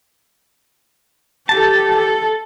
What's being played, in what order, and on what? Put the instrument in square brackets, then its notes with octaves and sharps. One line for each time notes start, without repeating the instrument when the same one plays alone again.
[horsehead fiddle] G4 A4 [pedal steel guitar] A5
[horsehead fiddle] A4